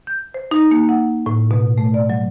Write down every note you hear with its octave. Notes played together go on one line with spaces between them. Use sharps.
G6
C5
D#4
A#3
F#5
A2
B2
A3
D5
F#3